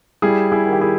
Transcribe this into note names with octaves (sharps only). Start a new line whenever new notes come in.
G3 E4 G#4
E4 G#4
D#3
G4
E4 G#4